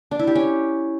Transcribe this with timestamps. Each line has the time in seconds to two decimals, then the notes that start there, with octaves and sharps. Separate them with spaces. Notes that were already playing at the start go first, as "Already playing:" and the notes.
0.11 D4
0.19 E4
0.27 G4
0.35 C#4